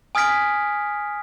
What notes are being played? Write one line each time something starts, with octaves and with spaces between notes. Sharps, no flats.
G#5 D#6 F6 G#6 B6 D7